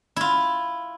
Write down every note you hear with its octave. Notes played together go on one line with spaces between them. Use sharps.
E4 F4